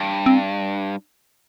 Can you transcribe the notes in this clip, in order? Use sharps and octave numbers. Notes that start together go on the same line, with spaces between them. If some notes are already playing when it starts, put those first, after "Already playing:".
Already playing: G2
C4